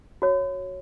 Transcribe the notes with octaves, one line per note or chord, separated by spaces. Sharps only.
F#4 C#5